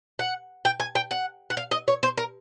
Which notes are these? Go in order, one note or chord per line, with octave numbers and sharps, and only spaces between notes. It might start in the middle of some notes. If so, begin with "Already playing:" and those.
F#5
G5
G#5
G5
F#5
F#5
F5
D#5
C#5
C5
A#4